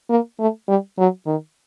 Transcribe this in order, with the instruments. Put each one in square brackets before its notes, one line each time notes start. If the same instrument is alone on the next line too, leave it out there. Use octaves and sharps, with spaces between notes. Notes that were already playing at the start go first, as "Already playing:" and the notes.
[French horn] A#3
A3
G3
F#3
D#3